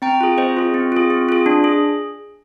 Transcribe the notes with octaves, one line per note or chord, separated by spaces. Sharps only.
C4 G5 A#5
F4 G#4
C4 C5 D#5
F4 G#4
C4
F4 G#4
C4
F4 G#4
D4
G#4